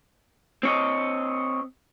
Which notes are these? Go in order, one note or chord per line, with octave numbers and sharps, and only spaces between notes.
C4 C#5 D#5